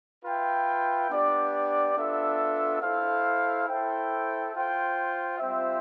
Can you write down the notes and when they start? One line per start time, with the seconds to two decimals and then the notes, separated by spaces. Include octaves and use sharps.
0.24 F4 B4 E5 G5
1.09 B3 D4 G4 D5
1.95 B3 D4 F4 A4 E5
2.81 E4 A4 C5 F5
3.67 E4 A4 C5 E5 G5
4.52 F4 C5 G5
5.38 G3 C4 F4 C5 E5